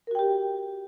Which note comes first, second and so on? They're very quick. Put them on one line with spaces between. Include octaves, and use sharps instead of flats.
A#4 F#4 G5 G4